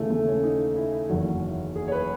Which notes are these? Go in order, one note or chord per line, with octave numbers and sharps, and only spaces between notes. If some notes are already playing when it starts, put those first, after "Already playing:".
Already playing: D#2 C#3 E3 A3
A3
C#4
D#4
E4
E4
F#1 E2 D#3 F#4
G#4
C#5
B4